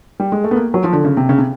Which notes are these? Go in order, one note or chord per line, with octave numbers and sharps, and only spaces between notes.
G3
G#3
A3
B3
A#3
F#3
F3
D3
C#3
C3
C#3
C3